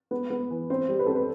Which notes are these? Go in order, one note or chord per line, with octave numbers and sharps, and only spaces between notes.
B3
B3
E3
C4 C5
G3
B4
C4 A4
B4